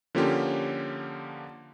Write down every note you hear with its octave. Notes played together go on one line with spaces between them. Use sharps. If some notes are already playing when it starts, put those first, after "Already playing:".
D3 F3 A#3 C#4 F4 G4